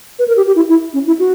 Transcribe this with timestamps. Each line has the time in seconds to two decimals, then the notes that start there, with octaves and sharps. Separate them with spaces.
0.19 B4
0.28 A#4
0.37 G4
0.47 G4
0.56 E4
0.69 E4
0.94 C#4
1.07 E4
1.19 F#4